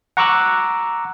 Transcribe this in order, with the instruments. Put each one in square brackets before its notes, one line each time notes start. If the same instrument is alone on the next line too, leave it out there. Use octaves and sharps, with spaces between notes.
[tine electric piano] F#5 A#5 C#6 D6 E6 F#6